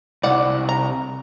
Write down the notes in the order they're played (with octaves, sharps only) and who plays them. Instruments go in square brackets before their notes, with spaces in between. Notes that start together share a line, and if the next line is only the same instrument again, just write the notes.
[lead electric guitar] C2 [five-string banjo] D5 F#5
[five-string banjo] A#5